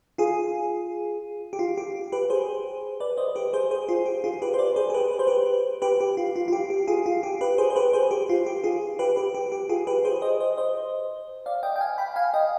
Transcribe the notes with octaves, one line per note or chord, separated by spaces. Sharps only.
F4 G#4
G4
F4
G4
G4 B4
G#4 C5
B4 D5
C5 D#5
G4 B4
G#4 C5
G#4 C5
F4 G#4
G4
F4 G#4
G4 B4
C5
B4 D5
G#4 C5
G#4
G4 B4
B4
C5
G4 B4
G4 B4
G4
F4
F4
F4
G4
G4
F4 G#4
F4
G4
G4 B4
G#4 C5
C5
G4 B4
G#4 C5
G4
F4
G4
F4 G#4
G4 B4
G4 B4
G4
G4
F4 G#4
G4 B4
G#4 C5
C5 D#5
C5 D#5
C5 D#5
D5 F5
D#5 G5
G5
F5 G#5
G5 B5
F5 G#5
D#5 G5